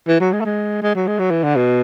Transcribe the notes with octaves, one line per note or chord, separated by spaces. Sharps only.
E3
F#3
G#3
A3
G#3
G#3
F#3
G#3
F#3
E3
D3
B2